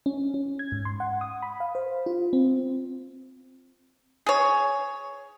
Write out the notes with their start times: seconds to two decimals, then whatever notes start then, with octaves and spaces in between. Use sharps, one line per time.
0.06 C#4
0.34 C#4
0.59 G#6
0.72 G#2
0.85 C6
1.00 F#5
1.21 D#6
1.42 B5
1.60 F5
1.75 C5
2.06 F4
2.33 C4
4.26 G#4 C#5